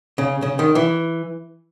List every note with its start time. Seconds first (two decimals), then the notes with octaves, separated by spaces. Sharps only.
0.18 C#3
0.42 C#3
0.59 D#3
0.75 E3